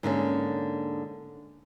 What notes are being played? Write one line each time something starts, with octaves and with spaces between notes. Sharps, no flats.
G#2 D3 A#3 C#4